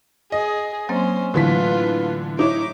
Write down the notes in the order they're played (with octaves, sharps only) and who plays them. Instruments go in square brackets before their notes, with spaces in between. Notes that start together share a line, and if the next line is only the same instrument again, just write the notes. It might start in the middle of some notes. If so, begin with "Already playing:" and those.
[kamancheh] G#4 [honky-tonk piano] D#5
[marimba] F#3 A#3 C4 [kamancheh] C#4 C5
[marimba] A2 F#3 A3 [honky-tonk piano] D3 E3 B6 [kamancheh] F4 B4
[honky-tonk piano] D#4 E4 C#5 [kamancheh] D6